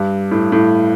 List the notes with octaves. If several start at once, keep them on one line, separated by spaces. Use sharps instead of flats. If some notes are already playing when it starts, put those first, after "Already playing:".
Already playing: G2
A2
A2